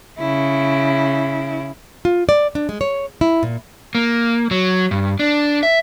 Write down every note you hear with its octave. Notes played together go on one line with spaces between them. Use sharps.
C#3 E4
F4
D5
D4
G#3
C#5
E4
A#2
A#3
F#3
G2
D4
E5